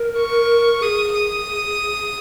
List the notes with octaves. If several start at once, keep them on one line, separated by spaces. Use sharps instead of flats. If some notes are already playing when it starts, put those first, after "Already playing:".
Already playing: A#4
C#6
G#4 D#6
D#6